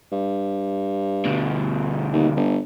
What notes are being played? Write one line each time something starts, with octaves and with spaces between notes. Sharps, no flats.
G2
D2 B2
D#2
G1